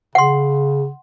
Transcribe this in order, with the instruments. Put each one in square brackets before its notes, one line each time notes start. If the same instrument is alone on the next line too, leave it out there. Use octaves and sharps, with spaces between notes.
[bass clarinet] C#3 [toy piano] F#5 C6